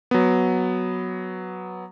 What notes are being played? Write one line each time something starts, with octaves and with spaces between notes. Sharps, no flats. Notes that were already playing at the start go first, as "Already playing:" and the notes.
F#3 B3